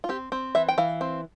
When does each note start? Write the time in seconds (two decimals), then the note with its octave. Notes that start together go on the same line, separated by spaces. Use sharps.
0.04 F4
0.09 C4 G4
0.32 C4
0.55 E3 E5
0.68 G5
0.78 E3 F5
1.01 C4